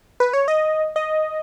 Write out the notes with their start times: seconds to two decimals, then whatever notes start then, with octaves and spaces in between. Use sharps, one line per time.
0.20 B4
0.33 C#5
0.48 D#5
0.96 D#5